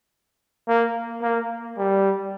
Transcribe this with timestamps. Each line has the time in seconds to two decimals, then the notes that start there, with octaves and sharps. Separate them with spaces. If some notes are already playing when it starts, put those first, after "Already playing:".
0.68 A#3
1.23 A#3
1.78 G3